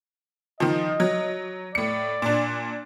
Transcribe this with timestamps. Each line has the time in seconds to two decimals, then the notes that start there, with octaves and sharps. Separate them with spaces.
0.60 D#3 F3 D#5
1.00 F#3
1.75 A2 D5 C#7
2.22 A#2 D4